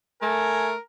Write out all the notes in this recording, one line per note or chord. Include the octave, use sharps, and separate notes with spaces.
A3 A#4 G#5